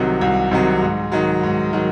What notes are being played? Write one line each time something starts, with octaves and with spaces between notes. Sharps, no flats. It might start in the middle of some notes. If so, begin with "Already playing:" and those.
Already playing: C2 C3 D#3 F#3
C2
C3 D#3 F#3
G#2
D#3 F#3
G#2
D#3 F#3